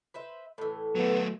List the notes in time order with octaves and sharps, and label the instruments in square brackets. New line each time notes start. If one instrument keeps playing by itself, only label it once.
[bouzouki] B4 C5 E5
A2 E3
[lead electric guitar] F#3 A3 [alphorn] B3